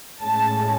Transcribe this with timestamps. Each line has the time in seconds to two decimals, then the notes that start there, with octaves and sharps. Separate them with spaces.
0.22 A2 G#3 C#4 A5